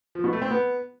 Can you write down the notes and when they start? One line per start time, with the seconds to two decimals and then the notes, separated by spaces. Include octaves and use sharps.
0.15 F3
0.24 B2
0.33 A3
0.42 C4
0.50 B3